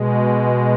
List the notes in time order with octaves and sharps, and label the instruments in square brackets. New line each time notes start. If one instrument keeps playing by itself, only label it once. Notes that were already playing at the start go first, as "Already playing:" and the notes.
Already playing: [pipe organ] B2 G#3